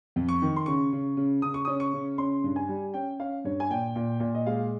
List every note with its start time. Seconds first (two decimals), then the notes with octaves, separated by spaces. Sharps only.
0.16 F2
0.29 C#6
0.42 D#3
0.56 C6
0.66 C#3 C#6
0.93 C#3
1.17 C#3
1.42 C#3 D#6
1.54 C#6
1.65 C#4 D#6
1.80 C#6
1.93 C#3
2.18 C#4 C6
2.44 G2
2.56 G#5
2.69 G3
2.94 C#4 G5
3.20 C#4 F5
3.44 G2 C#5
3.60 G#5
3.70 A#2 G5
3.96 A#2
4.20 A#2
4.35 D#5
4.46 G#3 F5